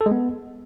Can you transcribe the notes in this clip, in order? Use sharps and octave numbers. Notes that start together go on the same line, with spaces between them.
A4
G#3
B3